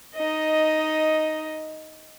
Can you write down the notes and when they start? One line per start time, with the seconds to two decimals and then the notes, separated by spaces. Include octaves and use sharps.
0.15 D#4 D#5